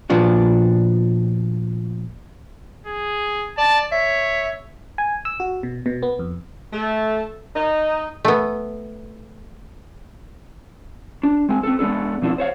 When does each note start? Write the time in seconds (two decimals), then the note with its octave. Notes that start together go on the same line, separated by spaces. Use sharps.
0.10 A#2 F3 B3 D4 F#4
2.87 G#4
3.58 D5 A5
3.92 C#5 E5
4.98 G#5
5.25 E6
5.40 F#4
5.63 B2
5.86 B2
6.03 B3
6.19 F2
6.72 A3
7.55 D#4
8.25 A3 B3
11.23 D4
11.49 G#3 C4 G#5
11.63 C4 A4
11.79 G#3 B3 D4 D#4 A4
12.22 B2 F3 C4 D4 E4
12.38 C5 C#5 F5